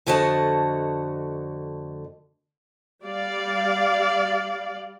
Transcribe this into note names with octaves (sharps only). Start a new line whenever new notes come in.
F2 D3 A3 F#4 D#5 A5
G3 D5 F5